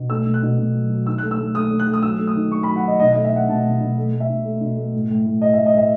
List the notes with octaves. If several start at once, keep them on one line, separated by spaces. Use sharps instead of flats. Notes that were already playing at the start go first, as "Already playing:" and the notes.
Already playing: B2
A3 E6
B2
F#6
B2
B2
F#3
F#3
D#3 E6
A3 F#6
E6
A3
A3 D#6
A3
F#6
A3
D#6
F#3 E6
A3
D#6
D#3
A3 C#6
F#3 B5
F#5
D#3 D#5
B2 D#5
A3 D#5
E5
A3 F#5
B2 A5
B2
B2
A3
A3
E5
B2
A3
B2
A3
A2
A2
A2
A2 D#5
A2 E5
D#5
A2 E5